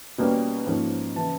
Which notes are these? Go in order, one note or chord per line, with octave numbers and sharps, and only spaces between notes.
B2 G3 A#3 C#4
G#2 F3 A#3 C#4
C#3 E3 A5